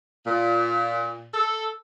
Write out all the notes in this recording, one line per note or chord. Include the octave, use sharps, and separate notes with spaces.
A#2
A4